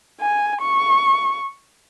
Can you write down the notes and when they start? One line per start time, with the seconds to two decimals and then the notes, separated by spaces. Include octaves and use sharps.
0.20 G#5
0.62 C#6